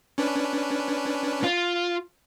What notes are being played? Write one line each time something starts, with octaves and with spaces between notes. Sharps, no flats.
C#4 D4 B4
F4